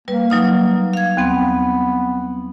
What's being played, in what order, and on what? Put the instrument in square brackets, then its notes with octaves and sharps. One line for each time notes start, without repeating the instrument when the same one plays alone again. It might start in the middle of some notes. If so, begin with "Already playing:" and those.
[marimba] G3 B4 [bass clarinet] A#3
[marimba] F#3 D#4 F6
F5 G#6
[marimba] D#2 C4 [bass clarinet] B3